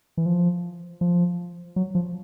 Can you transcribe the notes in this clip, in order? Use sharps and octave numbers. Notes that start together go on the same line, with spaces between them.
E3
F3
F3
F#3
F3